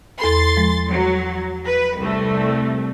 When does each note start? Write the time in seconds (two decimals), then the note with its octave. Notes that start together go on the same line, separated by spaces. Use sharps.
0.19 E2 A4 B5 C6 A6
0.57 F3 G#3
0.89 F#3
1.65 B4
2.00 C2 A3